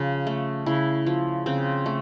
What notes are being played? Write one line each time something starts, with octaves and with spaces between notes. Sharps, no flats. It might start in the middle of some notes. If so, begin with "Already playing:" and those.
Already playing: C#3 F3
A3
C#3 E4
F3
C#3 C4
A3